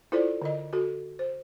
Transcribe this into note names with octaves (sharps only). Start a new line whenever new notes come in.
E4 F4 A4 C5 D5
D3 D#5
F#4 A4
C5